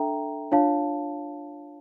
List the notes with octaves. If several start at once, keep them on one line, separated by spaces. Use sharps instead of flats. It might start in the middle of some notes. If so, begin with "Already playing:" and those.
Already playing: D4 A4 E5 G5 A#5
D4 F4 C#5 F5 A5